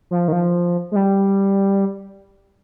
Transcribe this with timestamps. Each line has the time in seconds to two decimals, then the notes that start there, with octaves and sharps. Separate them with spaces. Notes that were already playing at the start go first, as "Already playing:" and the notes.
0.11 F3
0.28 D#3
0.32 F3
0.92 G#3
0.96 G3